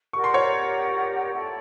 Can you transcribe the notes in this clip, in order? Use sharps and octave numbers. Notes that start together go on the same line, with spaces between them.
G4 A#4 D5 F#5 C#6
C6
C#5 C#6
E4 A4 D5 G5